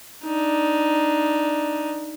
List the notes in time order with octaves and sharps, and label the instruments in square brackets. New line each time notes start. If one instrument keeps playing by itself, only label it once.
[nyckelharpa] D4 D#4